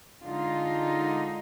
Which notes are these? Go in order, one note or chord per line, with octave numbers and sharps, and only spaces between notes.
D3 G#3 D#4 F4